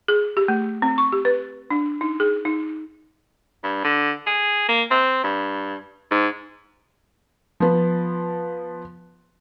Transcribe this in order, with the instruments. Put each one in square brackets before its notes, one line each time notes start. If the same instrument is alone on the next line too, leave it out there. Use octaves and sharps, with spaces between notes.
[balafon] G#4
G4
A3
C4
C#6
G4
B4
D4
D#4
G#4
D#4
[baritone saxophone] G2
D3
G#4
A#3
C4
G2
G#2
[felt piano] F3 B3